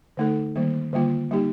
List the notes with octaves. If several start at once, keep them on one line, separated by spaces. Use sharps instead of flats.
D3 A3 D#4 A4
D#3 G3 A#3
D3 G3 A#3 F4
G3 A#3 D#4 G4